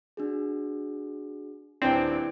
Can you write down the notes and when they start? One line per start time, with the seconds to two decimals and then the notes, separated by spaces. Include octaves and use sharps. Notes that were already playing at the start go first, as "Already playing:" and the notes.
0.17 D4 F#4 G#4
1.82 D#1 C4 D4 E4 B4 D7